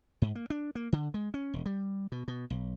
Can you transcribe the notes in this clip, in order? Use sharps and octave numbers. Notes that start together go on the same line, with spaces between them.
G#2
A#3
D4
A#3
D3
G#3
C#4
E1
G3
B2
B2
B1